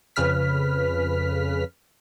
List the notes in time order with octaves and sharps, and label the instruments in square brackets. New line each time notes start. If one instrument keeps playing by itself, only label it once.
[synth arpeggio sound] F2 C#3 B4 F6 B6